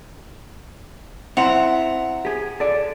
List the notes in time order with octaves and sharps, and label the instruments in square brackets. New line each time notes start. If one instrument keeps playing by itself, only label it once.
[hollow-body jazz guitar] C4 E4 C5 [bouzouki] F#5 A#5
[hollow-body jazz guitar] G4 G#4
A4 D5